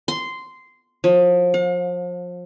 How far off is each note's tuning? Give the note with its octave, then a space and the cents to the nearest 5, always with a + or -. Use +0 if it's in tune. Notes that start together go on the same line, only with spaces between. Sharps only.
C6 -10
F3 +30
F5 +45